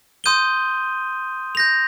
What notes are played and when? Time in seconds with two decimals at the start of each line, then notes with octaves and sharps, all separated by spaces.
0.24 C6 D#6 G6 D#7 G7
1.55 G6 A#6 F7